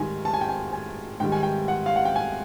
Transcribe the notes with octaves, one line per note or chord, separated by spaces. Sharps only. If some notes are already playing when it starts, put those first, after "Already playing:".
Already playing: G#2 D#3 G3 G#5
A5
G#5
G5
G#5
G#5
G#2 D#3 G3 G5
G#5
G5
F#5
F5
F#5
G5
G#5